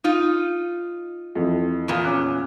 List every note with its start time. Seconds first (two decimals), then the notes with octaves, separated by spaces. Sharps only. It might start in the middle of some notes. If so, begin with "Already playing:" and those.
0.04 D#4 F4
1.35 F2 E3
1.88 E2 A#2
2.05 C#4 D6 F#6